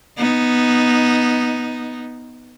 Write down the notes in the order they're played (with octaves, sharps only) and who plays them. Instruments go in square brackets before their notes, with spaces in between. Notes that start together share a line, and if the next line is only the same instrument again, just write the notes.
[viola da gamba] B3 D#4